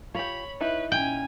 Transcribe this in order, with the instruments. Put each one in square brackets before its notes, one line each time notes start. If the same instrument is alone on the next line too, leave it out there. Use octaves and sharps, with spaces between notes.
[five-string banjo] F4 G4 [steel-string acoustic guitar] C#5 [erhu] B5
[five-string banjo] D#4 E4 [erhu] B4
[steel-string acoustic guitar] A#2 C#4 [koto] G5 [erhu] G#5